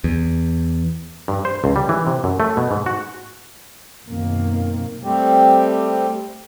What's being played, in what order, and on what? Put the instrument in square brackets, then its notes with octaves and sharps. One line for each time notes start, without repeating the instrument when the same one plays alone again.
[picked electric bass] E2
[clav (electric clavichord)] G2
C5
C#2
G3
E3
C3
F#2
A3
B2
G#2
F#4
[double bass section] F#2 B2 D#3 A#3 C4
[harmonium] G3 A3 C4 G4